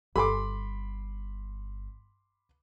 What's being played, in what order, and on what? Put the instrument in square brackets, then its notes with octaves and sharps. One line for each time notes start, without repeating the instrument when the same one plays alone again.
[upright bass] G1 [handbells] G4 A4 G#5 [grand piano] B5 C6 D6